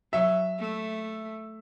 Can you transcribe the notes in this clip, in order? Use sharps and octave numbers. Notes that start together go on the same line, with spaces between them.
F#3 E5
A3